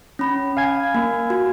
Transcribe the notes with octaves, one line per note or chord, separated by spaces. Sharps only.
C#4 B5
F5 G#5 G#6
A#3
F#4